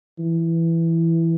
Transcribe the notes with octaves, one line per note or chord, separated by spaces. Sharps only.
E3